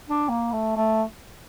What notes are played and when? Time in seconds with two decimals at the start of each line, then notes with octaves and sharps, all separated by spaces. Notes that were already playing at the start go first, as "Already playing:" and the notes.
0.10 D4
0.29 A#3
0.52 A3
0.77 A3